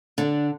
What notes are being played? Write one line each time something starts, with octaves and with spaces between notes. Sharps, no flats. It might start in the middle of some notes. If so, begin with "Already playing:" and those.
D3 D4